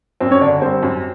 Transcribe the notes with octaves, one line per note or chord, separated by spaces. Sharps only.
F#2 C4 C5
C#4 C#5
D3 D4 D5
G3 C4 C5
F#2